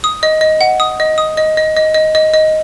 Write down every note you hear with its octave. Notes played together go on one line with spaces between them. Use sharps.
D#6
D#5
D#5
F#5
D#6
D#5
D#6
D#5
D#5
D#5
D#5
D#5
D#5